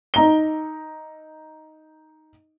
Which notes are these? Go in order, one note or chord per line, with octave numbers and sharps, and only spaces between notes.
D#4 A#5 G7